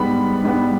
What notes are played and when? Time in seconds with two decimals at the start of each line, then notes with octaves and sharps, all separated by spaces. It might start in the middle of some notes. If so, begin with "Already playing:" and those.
Already playing: G#2 G3 B3 B5
0.44 G#2 G3 B3